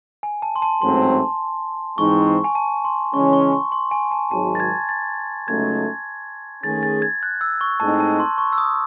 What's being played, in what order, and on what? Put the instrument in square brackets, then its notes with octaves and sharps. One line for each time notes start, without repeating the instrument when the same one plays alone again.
[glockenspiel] G#5
A5
C6
A5
[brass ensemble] A1 G#2 F#3 A3 C4 [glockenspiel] C6
[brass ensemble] G#2 E3 G#3 C4 D#4 [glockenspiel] C#6
[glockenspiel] G#5
A5
C6
[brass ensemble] C#3 E3 G#3 C#4 [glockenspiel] C#6
[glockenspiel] C#6
C6
C6
G#5
A5
[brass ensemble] G#1 G#2 F#3 [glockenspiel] A5
[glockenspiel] A6
G#6
A6
[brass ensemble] C#2 C#3 F#3 A3 D#4 [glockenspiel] G#6
[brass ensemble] D#3 A3 C#4 G#4 [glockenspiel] A6
[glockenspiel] A6
G#6
F#6
E6
C#6
[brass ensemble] A2 G#3 C4 D#4 [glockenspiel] A5
[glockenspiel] A5
C6
C#6
E6
D#6